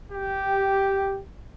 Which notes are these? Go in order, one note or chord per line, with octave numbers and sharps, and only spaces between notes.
G4